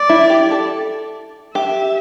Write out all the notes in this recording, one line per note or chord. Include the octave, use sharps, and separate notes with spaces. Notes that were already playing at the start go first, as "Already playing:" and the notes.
Already playing: D5
E4
G4
A4
G4 E5